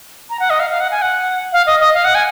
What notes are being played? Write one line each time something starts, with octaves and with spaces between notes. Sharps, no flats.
A#5
F#5
D#5
F5
F5
F#5
G#5
F#5
F5
D#5
D#5
F5
F#5
G#5